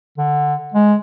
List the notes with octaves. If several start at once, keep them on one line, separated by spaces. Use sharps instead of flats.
D3
G#3